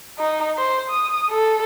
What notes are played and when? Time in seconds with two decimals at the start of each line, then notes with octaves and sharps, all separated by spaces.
0.18 D#4
0.57 C5
0.90 D#6
1.30 A4